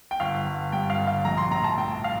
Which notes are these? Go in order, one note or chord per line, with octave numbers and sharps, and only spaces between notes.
G5
G1 F5
G1
G2 G5
F5
D3
F5
A#1 A#5
C6
A2 A#5
A5
A2 G5
F5